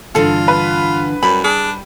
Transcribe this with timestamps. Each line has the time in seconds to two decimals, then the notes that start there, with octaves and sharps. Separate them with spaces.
0.15 G2 D3 E3 F4 A4
0.48 B4
1.23 F#2 G3 B5
1.44 D4 G#4